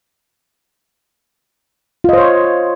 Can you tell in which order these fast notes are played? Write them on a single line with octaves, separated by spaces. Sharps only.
F4 D#5 C5 C#5